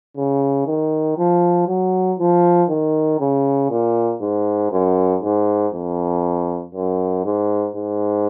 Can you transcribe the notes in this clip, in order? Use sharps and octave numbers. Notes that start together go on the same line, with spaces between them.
C#3
D#3
F3
F#3
F3
D#3
C#3
A#2
G#2
F#2
G#2
F2
F#2
G#2
G#2